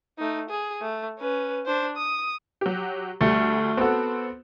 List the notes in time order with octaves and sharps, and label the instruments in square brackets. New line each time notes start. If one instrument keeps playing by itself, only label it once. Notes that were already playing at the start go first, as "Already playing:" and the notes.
[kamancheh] A3 D#4
G#4
A3
C#4 B4
D4 C5
D#6
[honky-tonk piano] F#3 G4
[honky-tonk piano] D2 G3 [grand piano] A3
[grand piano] B3 A4 [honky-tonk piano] C4 F#4